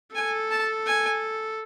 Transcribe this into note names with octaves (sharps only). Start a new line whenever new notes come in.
A4 G#5
A5
G#5